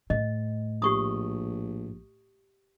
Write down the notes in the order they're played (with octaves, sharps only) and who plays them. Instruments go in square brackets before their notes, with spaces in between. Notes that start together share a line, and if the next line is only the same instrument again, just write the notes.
[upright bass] A2 [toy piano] D#5
[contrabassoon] A#1 [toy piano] G4 C#6 D#6